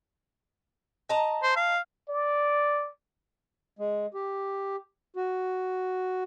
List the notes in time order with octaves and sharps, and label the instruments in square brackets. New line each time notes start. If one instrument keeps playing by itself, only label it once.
[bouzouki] D#5 A5 A#5
[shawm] C5
F5
[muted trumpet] D5
[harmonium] G#3
G4
F#4